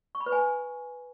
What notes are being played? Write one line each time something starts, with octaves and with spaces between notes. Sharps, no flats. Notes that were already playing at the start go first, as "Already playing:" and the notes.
C#6
B5
B4
G#5